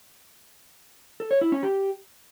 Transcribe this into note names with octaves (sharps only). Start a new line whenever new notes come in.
A4
C#5
E4
C#4
G4